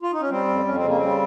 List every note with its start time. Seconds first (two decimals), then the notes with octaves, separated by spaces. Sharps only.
0.02 F4
0.12 D#4
0.21 C#4
0.30 G3 C4
0.48 F2
0.65 F2 C#4
0.76 C4
0.83 C#3 A#3
0.97 G3 C4